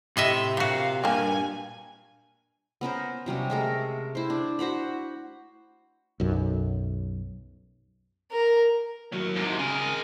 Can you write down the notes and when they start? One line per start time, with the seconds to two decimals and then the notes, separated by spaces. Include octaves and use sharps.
0.17 A2 C3 D#5 E5
0.57 A#2 F#4 F5
1.04 G2 A#3 G4 G#5
2.81 B3 C#4 A#4 C5
3.26 C3 F#3 G3 C#4
3.50 G#3 A3 A#4
4.15 E4 C5
4.30 D4
4.59 F#4 C5 F#5 B5
6.20 B1 F#2
8.32 A#4
9.12 D#2 A2 F#3 A#4 C#5
9.36 G#2 C3
9.59 C#3 G#3 A#4 G#5